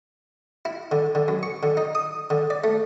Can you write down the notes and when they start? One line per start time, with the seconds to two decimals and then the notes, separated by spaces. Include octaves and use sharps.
0.65 E4
0.92 D3
1.15 D3
1.28 F#2
1.43 C#6
1.63 D3
1.77 D#4
1.95 D#6
2.30 D3
2.50 D5
2.64 A3